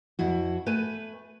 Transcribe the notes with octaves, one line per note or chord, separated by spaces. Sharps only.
F2 E4 F#4
A3 B4 G#5